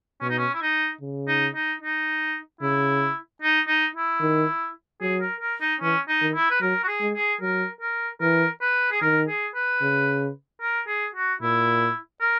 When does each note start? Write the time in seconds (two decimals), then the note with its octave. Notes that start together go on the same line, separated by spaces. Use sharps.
0.21 B2 C#4
0.29 D#4
0.38 C#4
0.54 E4
0.62 D#4
1.01 C#3
1.28 D#4
1.55 D#4
1.82 D#4
2.61 C#3 E4
3.42 D#4
3.68 D#4
3.95 E4
4.21 D#3
5.01 F#3 G#4
5.21 A#4
5.41 A#4
5.61 D#4
5.81 E3 C#4
6.08 D#4
6.21 D#3
6.34 E4
6.51 B4
6.61 F#3 A#4
6.83 F#4
6.88 G#4
7.01 G#3
7.15 G#4
7.41 F#3 A#4
7.81 A#4
8.21 E3 A#4
8.61 B4
8.91 G#4
9.02 D#3 A#4
9.28 G#4
9.55 B4
9.82 C#3
10.62 A#4
10.87 G#4
11.15 F#4
11.41 A#2 E4
12.21 A#4